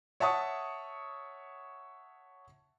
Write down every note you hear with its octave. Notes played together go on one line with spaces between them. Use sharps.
C#5 E5 F#5 A5 C#6 D#6